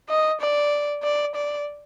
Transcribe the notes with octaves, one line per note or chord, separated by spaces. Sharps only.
D#5
D5
D5
D5